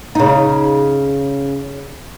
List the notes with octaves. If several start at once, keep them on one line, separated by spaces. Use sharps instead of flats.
C#3 D#4